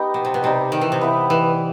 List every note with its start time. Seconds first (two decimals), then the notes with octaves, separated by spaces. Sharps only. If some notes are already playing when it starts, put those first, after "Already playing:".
Already playing: B3 D#4 G4 D#5
0.14 B2
0.25 C3
0.34 B2
0.43 C3 G3 D#4 G4
0.72 D#3
0.81 E3
0.92 C3
1.01 B3 E4 B4
1.30 E3